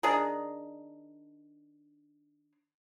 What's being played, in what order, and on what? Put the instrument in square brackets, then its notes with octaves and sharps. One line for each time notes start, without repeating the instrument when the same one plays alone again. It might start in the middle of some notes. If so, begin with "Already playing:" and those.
[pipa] D#3 D4 G#4 A#4